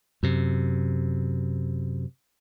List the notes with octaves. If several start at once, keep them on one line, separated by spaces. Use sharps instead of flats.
F#2 C3